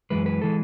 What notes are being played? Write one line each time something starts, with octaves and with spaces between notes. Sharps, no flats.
F#2 E3 G#3 B4
B4
E3 G#3 A4